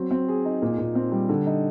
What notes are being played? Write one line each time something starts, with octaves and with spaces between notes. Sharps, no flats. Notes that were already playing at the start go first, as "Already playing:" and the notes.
Already playing: F#3 C4
C4
G#4
D#4
A#2
A#2
C4
G3
D3
D#4